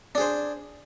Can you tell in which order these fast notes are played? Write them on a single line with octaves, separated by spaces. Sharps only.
D4 G#4 C5